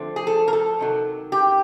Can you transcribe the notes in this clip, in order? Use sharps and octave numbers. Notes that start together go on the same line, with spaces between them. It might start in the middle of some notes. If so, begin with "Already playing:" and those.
Already playing: D3 F3 A3 C4
G#4
A4
A#4
A4
C3 D#3 F#3
G4